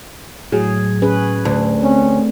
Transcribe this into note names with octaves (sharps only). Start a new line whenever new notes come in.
A2 F#3 G#4
C#4 G#4 B4
D2
C4 C#4